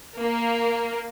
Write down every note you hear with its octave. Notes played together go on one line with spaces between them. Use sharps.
A#3